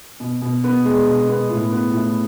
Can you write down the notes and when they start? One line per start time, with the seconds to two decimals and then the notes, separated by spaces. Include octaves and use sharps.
0.20 B2
0.42 B2
0.64 B3
0.85 G#3
1.07 B2
1.28 B3
1.50 A2
1.72 B3
1.94 A2